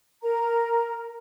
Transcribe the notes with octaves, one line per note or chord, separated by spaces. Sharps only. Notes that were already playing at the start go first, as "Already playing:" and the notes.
A#4 A#5